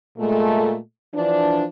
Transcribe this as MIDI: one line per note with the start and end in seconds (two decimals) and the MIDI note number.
0.19 0.78 46
0.19 0.78 56
0.19 0.78 57
1.15 1.65 52
1.15 1.65 53
1.15 1.65 62